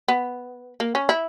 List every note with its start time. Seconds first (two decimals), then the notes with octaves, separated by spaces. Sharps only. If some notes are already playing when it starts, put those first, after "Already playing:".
0.08 B3
0.80 A#3
0.95 C#4
1.09 E4